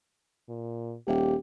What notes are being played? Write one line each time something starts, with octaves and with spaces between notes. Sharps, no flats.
A#2
D#1 G4